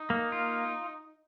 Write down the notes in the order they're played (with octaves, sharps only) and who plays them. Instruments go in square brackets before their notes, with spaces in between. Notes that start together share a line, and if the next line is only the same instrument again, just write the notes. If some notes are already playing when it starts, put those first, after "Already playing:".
Already playing: [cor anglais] D#4
[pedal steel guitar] A#3
F4